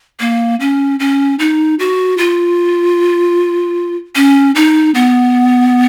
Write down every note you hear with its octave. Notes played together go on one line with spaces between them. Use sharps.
A#3
C#4
C#4
D#4
F#4
F4
C#4
D#4
B3